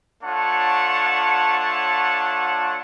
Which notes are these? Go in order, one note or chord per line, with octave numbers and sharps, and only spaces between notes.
A3 D4 F4 C#5 F#5 A5